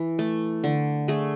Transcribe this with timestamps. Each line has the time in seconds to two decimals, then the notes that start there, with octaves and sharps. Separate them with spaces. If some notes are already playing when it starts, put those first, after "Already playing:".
Already playing: E3
0.19 A3
0.64 D3
1.08 A3 G#4